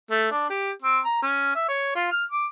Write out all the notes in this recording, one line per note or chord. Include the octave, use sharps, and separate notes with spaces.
A3
D4
G4
C4
A#5
C#4
E5
C#5
F4
F6
D6